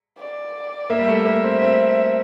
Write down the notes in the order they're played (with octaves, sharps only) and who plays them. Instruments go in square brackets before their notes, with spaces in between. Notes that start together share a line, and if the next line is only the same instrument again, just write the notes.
[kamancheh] D5
[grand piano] A#3 [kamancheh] E5
[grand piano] G3
A3
[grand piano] A#3 [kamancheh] E5
[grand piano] C4
C4